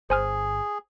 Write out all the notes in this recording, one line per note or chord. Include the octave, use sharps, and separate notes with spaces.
G1 G#4 C5 G#5 F6